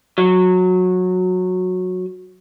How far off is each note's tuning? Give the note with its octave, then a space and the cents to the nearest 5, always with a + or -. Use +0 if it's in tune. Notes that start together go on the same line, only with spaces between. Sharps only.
F#3 -15